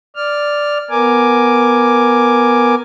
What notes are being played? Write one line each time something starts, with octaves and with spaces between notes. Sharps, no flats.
D5 F6
B3 A#4 G#5 D6